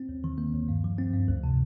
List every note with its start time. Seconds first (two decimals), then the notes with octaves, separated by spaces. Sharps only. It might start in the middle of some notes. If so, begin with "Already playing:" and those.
Already playing: C4
0.09 D#2
0.24 D#3
0.38 A#3
0.54 D#2
0.69 G2
0.84 F3
0.99 C4
1.14 G2
1.28 D2
1.44 C3